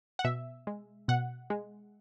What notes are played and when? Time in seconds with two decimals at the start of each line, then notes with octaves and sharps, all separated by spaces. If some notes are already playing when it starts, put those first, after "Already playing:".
0.19 F#5
0.24 B2 E5
0.67 G#3
1.08 B2 F#5
1.50 G#3